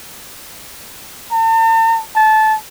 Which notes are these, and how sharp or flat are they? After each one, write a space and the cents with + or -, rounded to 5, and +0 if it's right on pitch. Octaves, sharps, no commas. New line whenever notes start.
A5 +45
A5 -20